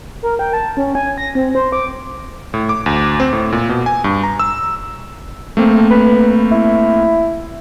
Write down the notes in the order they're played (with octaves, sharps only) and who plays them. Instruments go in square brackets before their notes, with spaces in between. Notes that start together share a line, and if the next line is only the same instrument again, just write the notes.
[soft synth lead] A#4
G5
A5
C#4
G#5
A#6
C4
C5
D6
[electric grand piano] A2
D6
D2
C4
A2
A#2
B2
G#5
G2
A#5
E6
A3 A#3 C4
[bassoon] B4
E4